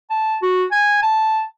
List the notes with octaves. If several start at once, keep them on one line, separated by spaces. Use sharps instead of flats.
A5
F#4
G#5
A5